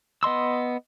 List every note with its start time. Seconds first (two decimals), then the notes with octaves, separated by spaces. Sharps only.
0.23 B3 D#5 C6 E6